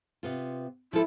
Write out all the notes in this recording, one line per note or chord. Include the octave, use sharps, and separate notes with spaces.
C3 B3 F4
F3 E4 A4